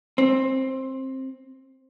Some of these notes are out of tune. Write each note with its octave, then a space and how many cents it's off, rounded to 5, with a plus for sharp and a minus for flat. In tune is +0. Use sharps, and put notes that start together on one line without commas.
C4 +15